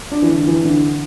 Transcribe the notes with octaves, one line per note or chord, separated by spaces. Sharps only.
D4
E3
D3
E3
D3